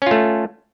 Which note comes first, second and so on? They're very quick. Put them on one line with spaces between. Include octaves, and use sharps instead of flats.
C#4 F4 A3